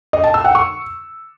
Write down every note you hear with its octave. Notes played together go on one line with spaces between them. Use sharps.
D#5
A5
E6
F#5
C#6